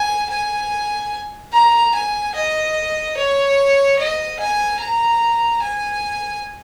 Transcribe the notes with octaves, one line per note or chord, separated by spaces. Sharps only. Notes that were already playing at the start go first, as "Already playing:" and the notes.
Already playing: G#5
G#5
A#5
G#5
D#5
C#5
D#5
G#5
A#5
G#5